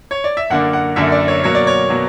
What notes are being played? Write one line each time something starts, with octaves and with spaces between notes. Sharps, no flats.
C#5
D5
E5
F#2 D3 A#3 D4 F#5
F#5
F#2 D3 A#3 D4 E5
D5
C#5
B2 F#3 A#3 C#5
D5
C#5
B2 F#3 A#3